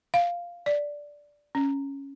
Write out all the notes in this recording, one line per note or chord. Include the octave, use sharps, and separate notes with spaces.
F5
D5
C#4